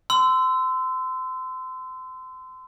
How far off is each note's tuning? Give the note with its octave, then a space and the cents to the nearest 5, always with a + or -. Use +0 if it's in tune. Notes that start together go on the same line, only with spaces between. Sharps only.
C6 -30 E6 +0